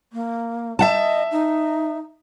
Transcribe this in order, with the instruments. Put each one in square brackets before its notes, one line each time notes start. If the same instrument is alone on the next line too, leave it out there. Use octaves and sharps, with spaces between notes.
[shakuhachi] A#3
[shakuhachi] D#5 [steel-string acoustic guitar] E5 F#5 A5
[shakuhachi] D#4